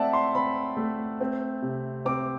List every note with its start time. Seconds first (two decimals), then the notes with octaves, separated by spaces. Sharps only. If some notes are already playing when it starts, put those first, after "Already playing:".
Already playing: A3 C4 D5 E5 F#5 A5
0.13 C6
0.35 C4 B5
0.77 A3
1.21 C4
1.62 C3
2.05 C4 D6